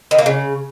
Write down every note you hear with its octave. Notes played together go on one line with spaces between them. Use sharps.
D#3
A#3
C#3